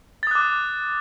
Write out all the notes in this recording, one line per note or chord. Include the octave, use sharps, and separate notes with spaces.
D6 D#6 F#6 A6